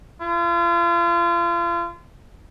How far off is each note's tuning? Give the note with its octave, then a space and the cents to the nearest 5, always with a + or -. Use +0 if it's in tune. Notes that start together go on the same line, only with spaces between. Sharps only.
F4 -35